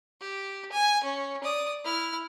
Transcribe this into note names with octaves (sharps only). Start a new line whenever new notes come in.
G4
G#5
C#4
D5 D#6
E4 F6